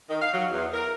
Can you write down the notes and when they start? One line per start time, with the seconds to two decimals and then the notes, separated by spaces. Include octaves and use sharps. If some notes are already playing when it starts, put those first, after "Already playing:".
0.09 D#3
0.21 F5
0.33 F#3
0.50 E2
0.73 A#4